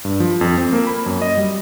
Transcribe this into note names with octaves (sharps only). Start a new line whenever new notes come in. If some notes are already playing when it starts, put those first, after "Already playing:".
G2
F3
F2
C4
A#3
B5
F#2
D#5
G3